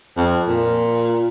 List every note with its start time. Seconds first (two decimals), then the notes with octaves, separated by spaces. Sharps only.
0.17 F2
0.48 A#2